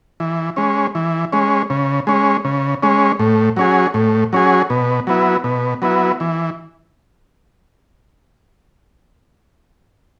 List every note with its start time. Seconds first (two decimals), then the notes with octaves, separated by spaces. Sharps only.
0.20 E3
0.56 G#3 C#4
0.95 E3
1.33 G#3 C#4
1.70 C#3
2.07 G#3 C#4
2.45 C#3
2.83 G#3 C#4
3.19 A2
3.56 F#3 C#4 G#4
3.94 A2
4.33 F#3 C#4 G#4
4.70 B2
5.07 F#3 B3 E4
5.44 B2
5.82 F#3 B3 E4
6.20 E3